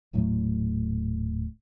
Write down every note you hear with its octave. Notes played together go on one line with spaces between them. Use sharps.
D#1 A2 F#3 A3